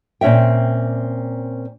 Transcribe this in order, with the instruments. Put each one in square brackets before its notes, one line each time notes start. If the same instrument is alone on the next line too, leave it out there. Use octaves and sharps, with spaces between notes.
[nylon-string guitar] A#2 C4 C#4 E5 G5